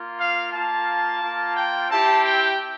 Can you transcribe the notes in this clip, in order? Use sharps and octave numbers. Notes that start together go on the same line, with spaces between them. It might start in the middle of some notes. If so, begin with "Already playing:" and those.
Already playing: A#3 F4
F5
A#3 F4 A5
A#3 F4
G5
C4 E4 G4 A5
G5